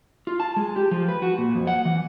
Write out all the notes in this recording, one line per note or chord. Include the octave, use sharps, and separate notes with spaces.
F4
A5
G#3
G4
F3
B4
F#4
A#2
F2
F#5
E3